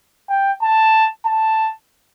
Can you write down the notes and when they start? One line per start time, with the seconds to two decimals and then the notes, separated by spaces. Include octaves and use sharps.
0.29 G5
0.62 A5
1.26 A5